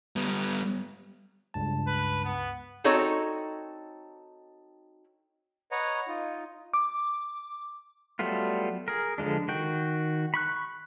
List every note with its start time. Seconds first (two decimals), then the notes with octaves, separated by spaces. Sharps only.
0.16 G3 B3
1.54 C#2 G2 A5
1.87 B4
2.24 B3
2.84 C4 D#4 F#4 A4 C#5 D#5
5.72 B4 C#5 D#5 F#5 A#5
6.08 D#4 F4
6.74 D6
8.19 F#3 G3 A3 B3 F4
8.88 G#4 A#4
9.18 D3 F3 G#3 D4
9.48 D#3 F#4 G5
10.34 B5 C#6 F#6